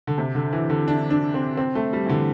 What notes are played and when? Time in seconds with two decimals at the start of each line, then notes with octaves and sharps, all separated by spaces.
0.07 D3
0.18 C3
0.35 D3
0.53 E3
0.70 D3
0.88 D4
1.10 D4
1.34 C4
1.57 C4
1.75 A3
1.93 G3
2.06 E3
2.09 D3